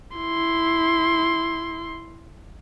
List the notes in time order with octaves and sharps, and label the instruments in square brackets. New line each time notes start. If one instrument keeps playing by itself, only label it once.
[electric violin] E4 C6